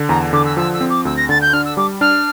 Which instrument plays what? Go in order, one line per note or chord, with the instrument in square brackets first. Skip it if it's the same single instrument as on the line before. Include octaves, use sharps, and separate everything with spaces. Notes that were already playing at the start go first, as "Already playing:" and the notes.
Already playing: [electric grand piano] D3
[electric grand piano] E2 [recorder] A#5
[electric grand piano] D3 [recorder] D6
[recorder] E6
[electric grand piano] F3 [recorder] E6
[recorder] E6
[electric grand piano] C4
[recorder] D6
[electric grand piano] D2 [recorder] E6
[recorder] A#6
[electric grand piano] D3 [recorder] A6
[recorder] G6
[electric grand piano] D4 [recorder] F6
[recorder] E6
[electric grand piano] G3 [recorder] D6
[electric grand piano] D4 [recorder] F6